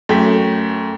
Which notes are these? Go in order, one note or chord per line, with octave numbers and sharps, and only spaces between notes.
F#2 A3 G5 B6